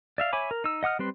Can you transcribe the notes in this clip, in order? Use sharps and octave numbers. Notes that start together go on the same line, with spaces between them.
D5 E5 F5
C#5 E5 G#5 B5 D6
A#4
D#4 E6
D#5 F#5 D#6 F6
G3 C4 B4 C6